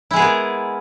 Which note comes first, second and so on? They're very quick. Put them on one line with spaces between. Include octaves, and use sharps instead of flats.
E4 G#3 G#4 B3 A#4